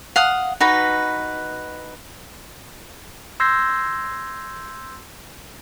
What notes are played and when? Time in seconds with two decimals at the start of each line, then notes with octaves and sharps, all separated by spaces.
0.16 F5 F#5 D#6
0.60 D#4 F#4 B4 B5
3.40 C6 E6 G6 G#6 A#6 C7